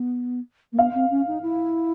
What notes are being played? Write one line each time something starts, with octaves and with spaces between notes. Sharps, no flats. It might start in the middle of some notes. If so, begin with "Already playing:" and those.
Already playing: B3
A#3
B3 F5
C4
C#4
D#4
E4